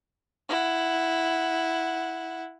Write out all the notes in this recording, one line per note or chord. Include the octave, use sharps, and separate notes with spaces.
E4 F#5